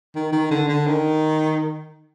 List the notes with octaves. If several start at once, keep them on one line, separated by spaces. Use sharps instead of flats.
D#3
D#3
D3
D3
D#3